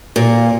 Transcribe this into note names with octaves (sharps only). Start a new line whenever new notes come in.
A#2